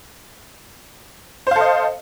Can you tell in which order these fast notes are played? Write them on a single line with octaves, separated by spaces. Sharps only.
C5 F5 A4 D#5